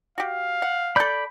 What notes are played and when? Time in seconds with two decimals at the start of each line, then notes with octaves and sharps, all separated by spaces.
0.18 F#4 G4 F5
0.62 F#5
0.96 A4 D5 B5 G6